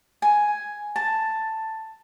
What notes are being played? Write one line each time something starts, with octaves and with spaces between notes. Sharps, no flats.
G#5
A5